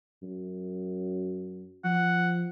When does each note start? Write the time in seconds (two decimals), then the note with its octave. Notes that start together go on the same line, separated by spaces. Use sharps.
0.22 F#2
1.84 F3 F#5